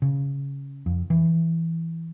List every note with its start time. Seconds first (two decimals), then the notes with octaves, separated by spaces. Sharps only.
0.02 C#3
0.86 F2
1.10 E3